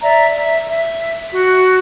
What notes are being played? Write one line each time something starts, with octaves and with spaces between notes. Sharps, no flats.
D5 E5 A#5
E5
E5
F#4